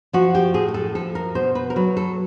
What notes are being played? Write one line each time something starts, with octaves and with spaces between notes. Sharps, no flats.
F3 F#4
G4
A2 G#4
G#4
A4
F3 A4
A#4
B2 C5
B4
A#4
F#3 B4
A4